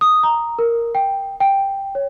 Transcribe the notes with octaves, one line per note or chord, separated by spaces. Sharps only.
D#6
A#5
A#4
G5
G5
C#5